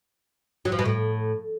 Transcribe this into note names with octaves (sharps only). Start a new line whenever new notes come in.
F#3
F3
B2
A2